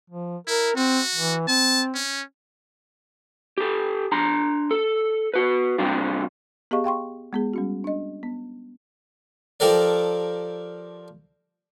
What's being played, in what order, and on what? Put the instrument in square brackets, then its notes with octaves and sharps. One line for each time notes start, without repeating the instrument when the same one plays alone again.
[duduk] F3
[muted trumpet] E4 [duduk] A#4
[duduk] C4 [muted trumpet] F#4
[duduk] E3
[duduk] C4 [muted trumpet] A5
[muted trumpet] C#4
[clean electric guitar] G4 A4
D4 A#5 C6
A4
F#4 B4
C3 G3 C4 D4 F4
[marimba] B3 G4 G#4 D#5 F5 C#6
F5 G5 C6 C#6
G#3 B3 G#4
G3 C#4 F#4
D4 D#5
B3
[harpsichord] F3 G4 A4 A#4 D5